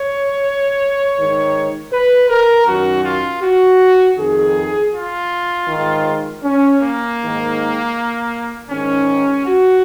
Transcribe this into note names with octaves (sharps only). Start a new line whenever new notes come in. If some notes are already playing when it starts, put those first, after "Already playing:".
Already playing: C#5
G#2 D#3
B4
A#4
F#2 D#3 F#4
F4
F#4
F2 D#3 G#4
F4
G#2 D#3
C#4
A#3
G#2 D#3
G#2 D#3 C#4
F#4